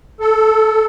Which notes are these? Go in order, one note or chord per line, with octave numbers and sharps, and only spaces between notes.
A4